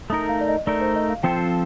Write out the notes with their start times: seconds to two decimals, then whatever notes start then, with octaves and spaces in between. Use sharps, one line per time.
0.10 A3 D#4 A#4 D#6
0.29 F5
0.41 D5
0.48 D#5
0.66 A3 D#4 A#4 D5
0.81 C5
0.95 D#5
1.09 F5
1.23 F3 C4 F4 A4 C5 G5